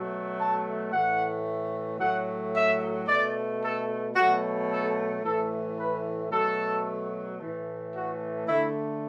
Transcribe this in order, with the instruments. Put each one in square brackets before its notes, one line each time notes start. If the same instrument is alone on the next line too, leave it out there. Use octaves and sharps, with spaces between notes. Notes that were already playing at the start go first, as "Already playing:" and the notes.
Already playing: [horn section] B2 F#3 A3
A5
A2 E3 A3 F#5
A2 F#3 A3 F#5
E5
B2 A3 D5
A4
B2 F#3 A3 F#4
A4
A2 E3 A3 A4
B4
B2 F#3 A3 A4
A2 E3 A3
F#4
D3 A3 E4